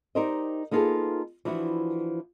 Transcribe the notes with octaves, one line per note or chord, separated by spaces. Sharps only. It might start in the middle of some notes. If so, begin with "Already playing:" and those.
D#4 G4 A#4 C5 D5 D#5
A#3 B3 D#4 F4 G#4 A4
E3 F3 D4 E4 F#4